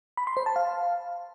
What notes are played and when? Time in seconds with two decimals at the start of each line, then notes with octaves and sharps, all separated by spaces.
0.17 B5
0.27 C6
0.37 C5
0.46 A5
0.56 F5